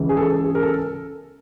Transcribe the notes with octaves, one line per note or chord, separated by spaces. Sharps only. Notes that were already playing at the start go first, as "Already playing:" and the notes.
Already playing: C#2 C#3 E3
G#4
A4
G#4
A#4
A4